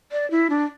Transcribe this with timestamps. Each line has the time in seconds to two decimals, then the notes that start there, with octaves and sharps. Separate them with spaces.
0.12 D5
0.31 E4
0.50 D4